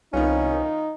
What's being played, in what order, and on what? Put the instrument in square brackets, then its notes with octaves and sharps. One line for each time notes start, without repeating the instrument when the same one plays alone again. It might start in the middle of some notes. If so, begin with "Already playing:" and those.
[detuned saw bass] C2 [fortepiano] D#3 B3 F4 [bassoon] C#4 [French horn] D#4